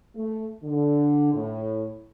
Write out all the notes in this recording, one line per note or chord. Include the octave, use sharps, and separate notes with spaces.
A3
D3
A2